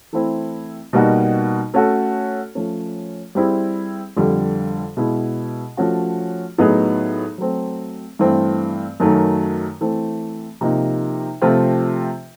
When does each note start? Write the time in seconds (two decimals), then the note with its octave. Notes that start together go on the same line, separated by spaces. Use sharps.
0.13 E3 A3 C4 E4
0.93 B2 G3 A#3 D#4 F#4
1.74 A3 C#4 F#4 A4
2.55 F3 A3 C#4
3.35 G3 C4 E4 G#4
4.17 F2 D3 G3
4.97 B2 G#3 B3 E4
5.77 F3 A3 C#4 F#4
6.58 A2 F#3 B3 D#4 G#4
7.38 F#3 A3 C4
8.19 G2 E3 A3 C4
9.00 F#2 D#3 F#3 A3
9.81 E3 A3 C4
10.61 C3 F3 A#3 D#4
11.42 C3 F3 A3 C4 F4